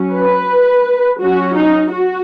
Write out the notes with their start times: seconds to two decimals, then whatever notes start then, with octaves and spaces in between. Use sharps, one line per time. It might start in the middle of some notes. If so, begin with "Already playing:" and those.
Already playing: F#3 C#4
0.14 B4
1.21 F#3 C#4 F#4
1.56 D#4
1.92 F#4